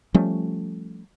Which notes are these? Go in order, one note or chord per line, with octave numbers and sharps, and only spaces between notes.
F3 G3 A3 C#4